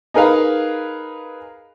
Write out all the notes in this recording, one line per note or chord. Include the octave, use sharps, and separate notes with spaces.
D#4 G#4 A#4 B4 F5